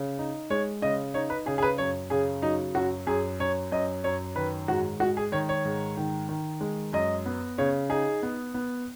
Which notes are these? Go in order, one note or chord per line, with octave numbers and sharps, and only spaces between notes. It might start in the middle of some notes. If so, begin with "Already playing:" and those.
Already playing: C#3
D#4
G#3 C#5
C#3 D#5
D#4 C#5
B4
C#3 G#4
G#4
B4
F#2 C#5
C#3 G#4
F#3 D#4
F#2 F#4
F#2 G#4
F#2 C#5
F#2 D#5
F#2 C#5
D#3 B4
G#2 F#4
G#3 F#4
G#4
D#3 C#5
C#5
G#2
D#3
D#3
G#3
F#2 D#5
B3
C#3 C#5
D#4 G#4
B3
B3